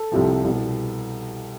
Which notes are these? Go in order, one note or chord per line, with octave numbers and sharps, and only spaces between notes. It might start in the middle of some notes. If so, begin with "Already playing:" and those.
Already playing: A4
C2 C3 F3
C2 B2